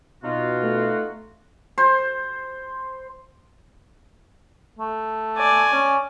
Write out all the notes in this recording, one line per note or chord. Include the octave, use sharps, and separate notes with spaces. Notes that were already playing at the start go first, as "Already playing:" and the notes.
B2 D#4 F4 F#4
A3
C5
A3
D5 G#5
C#4